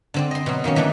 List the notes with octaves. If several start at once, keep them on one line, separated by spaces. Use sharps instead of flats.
D3 C4 D5
D#5 C6
B2 F#3
D#3 F#3 A#3 C#4
D3 E3 A3 D4 D#4